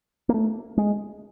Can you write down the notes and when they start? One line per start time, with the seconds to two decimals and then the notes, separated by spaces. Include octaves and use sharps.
0.29 A#3
0.34 A3
0.77 G#3